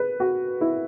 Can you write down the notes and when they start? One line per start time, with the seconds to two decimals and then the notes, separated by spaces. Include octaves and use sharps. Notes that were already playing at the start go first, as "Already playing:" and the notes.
Already playing: B4
0.20 F#4
0.61 E4